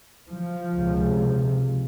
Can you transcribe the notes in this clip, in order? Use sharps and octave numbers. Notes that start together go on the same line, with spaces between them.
F3
C#2 C3